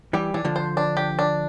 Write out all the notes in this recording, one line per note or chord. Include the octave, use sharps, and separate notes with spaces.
E3 G3 G4
E3 D4
D3 F3
C5
D4
G4
D4